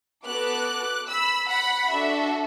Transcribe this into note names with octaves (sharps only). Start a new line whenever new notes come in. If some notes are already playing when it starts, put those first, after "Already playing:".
B3 F#4 A4 D6 F#6
B5 E6
F#5 B5
D4 F#4 A4 E5